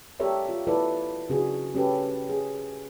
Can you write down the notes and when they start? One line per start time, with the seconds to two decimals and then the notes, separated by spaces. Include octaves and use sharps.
0.20 G4 A4 A#4 C#5 D5 E5
0.49 F4
0.67 E4 A4 B4 D5
1.29 C#3 D4 F#4 G#4
1.75 C#4 G4 A4 B4
2.29 G#4